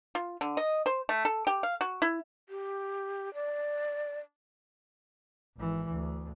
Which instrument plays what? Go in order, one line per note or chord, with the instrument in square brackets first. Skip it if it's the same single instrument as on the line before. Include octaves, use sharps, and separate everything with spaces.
[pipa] F4
D3
D#5
C5
A3
A4
G4
F5
F#4
E4
[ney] G4
D5
[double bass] G#1 E3
D2